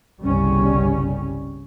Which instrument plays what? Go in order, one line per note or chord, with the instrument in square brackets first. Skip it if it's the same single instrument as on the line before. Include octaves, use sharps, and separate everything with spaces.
[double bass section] G1 C2 C#3 G3 C#4